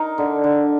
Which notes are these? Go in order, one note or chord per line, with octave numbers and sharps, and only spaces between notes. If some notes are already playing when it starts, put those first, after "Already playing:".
Already playing: D#4 A#4
D3
D3